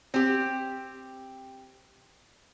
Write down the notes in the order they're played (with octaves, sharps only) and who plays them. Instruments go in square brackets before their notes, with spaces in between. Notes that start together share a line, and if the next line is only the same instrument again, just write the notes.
[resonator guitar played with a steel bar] C4 G4